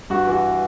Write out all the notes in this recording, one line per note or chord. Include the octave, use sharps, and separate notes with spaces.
G2 F#4
E3 F#4